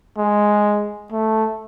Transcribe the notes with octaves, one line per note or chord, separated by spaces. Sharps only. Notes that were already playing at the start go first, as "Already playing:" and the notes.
G#3
A3